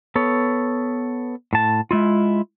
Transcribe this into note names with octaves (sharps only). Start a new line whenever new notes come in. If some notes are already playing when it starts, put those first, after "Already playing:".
B3 A4 C#5
A2 A5
G#3 E4 F4